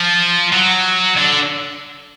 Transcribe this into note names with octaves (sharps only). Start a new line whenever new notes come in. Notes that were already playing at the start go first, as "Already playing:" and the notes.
Already playing: F3
F#3
D3